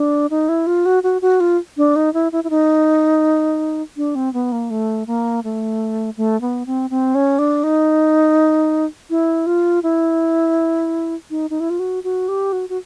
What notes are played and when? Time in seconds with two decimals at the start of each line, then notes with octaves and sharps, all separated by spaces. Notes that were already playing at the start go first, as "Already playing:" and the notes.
Already playing: D4
0.30 D#4
0.49 E4
0.67 F4
0.86 F#4
1.03 F#4
1.22 F#4
1.40 F4
1.77 D4
1.96 D#4
2.14 E4
2.32 E4
2.44 E4
2.50 D#4
3.97 D4
4.15 C4
4.33 B3
4.52 A#3
4.70 A3
5.07 A#3
5.44 A3
6.17 A3
6.41 B3
6.66 C4
6.90 C4
7.15 C#4
7.39 D4
7.64 D#4
9.10 E4
9.46 F4
9.83 E4
11.30 D#4
11.50 D#4
11.60 E4
11.70 F4
11.79 F#4
12.04 F#4
12.28 G4
12.53 F#4
12.69 F#4